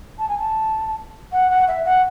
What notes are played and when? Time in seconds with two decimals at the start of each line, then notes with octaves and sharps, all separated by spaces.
0.19 A5
0.28 G#5
0.39 A5
1.32 F#5
1.50 F#5
1.68 E5
1.85 F#5